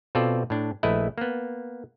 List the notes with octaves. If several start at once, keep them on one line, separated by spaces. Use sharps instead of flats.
B2 C4 F4 A4 D5
A2 D4
A#1 A3 E4 B4 D#5
A#3 B3